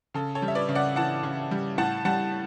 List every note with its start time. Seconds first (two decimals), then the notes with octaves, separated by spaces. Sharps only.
0.14 C#3 A4
0.35 A4 C#5
0.42 G3
0.48 E5
0.55 B4 D5
0.69 C#3
0.75 D5 F#5
0.96 E3 F#5 A5
1.23 C#3
1.51 G3
1.78 A2 F#5 A5
2.05 G3 F#5 A5